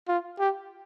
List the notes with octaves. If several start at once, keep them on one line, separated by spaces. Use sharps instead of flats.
F4
G4